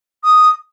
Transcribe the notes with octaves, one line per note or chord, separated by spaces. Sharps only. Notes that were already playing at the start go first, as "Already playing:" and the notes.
D#6